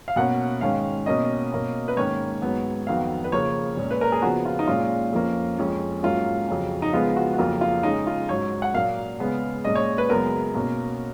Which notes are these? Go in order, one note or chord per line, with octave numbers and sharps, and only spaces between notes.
F5
B2 A#3 C#4 F#5
G#2 D#3 G#3 C#4 F5
B2 A#3 C#4 D#5
B2 A#3 C#4
B4
G#2 D#3 A#3 C#4 C#5
G#2 F#3 B3
F2 D#3 F#3 B3 F5
B4
C#3 F3 A#3 C#5
A#2 G#3 C#4
B4
A#4
G#4
C#3 F3 B3 F#4
F4
D#4
A#2 G#3 C#4 F4
F2 F3 A#3 C#4
F2 F3 G#3 C#4
G#2 F#3 A#3 C#4 F4
F2 C#3 F#3 C#4
D#4
C#3 F3 G#3 B3 F4
F#4
F#4
F2 C#3 F#3 A#3 F4
F4
C#3 G#3 C#4 D#4
F4
G#2 F#3 C#4 C#5
F#5
A#2 F#3 A#3 F5
C#3 G#3 B3
A#2 G#3 C#4 D#5
C#5
B4
F#2 C#3 G#3 B3 A#4
B2 A#3 C#4